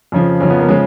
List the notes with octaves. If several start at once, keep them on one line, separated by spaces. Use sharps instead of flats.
F2 C#3 F3
F2 C#3 F3 C#4
B3
A#3
C#3 F3 G#3